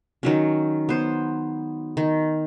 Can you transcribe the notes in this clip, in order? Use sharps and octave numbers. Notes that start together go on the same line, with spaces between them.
D#3 F#3 C#4
B3 C5
D#3